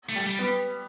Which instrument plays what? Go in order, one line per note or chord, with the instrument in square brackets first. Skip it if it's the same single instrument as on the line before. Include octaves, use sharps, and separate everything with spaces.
[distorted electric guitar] A3
[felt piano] G3
[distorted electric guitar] G3
[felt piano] B3